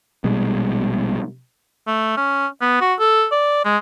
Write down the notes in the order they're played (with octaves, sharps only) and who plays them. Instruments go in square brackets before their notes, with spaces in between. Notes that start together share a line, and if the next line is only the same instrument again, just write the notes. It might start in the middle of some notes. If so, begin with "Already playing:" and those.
[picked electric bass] A#1 B2 G3 G#3
[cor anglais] A3
C#4
B3
F#4
A4
D5
G#3